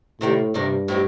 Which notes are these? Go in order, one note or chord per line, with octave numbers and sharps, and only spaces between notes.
A2 C3 D#3 G3 A#3
G2 C3 D#3 G3 A#3
A2 F#3 C4 D#4 G4